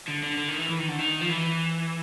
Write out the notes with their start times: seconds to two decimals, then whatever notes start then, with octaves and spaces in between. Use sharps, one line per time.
0.08 D3
0.23 D3
0.38 D3
0.49 D#3
0.58 E3
0.69 E3
0.79 D#3
0.88 D3
0.99 D#3
1.21 F3
1.29 E3